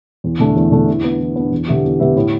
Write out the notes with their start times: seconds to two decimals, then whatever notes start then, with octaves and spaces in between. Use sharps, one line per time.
0.24 E2
0.40 D3 A3 D4
0.56 E2
0.72 D3 A3 D4
0.88 E3
1.04 B3 D4
1.20 E3
1.36 B3 D4
1.52 E2
1.68 D3 B3 G4 E5
1.84 E2
2.00 D3 B3 G4 E5
2.16 A2